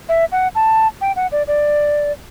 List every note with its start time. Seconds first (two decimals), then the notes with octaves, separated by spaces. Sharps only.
0.09 E5
0.32 F#5
0.55 A5
1.01 G5
1.16 F#5
1.32 D5
1.48 D5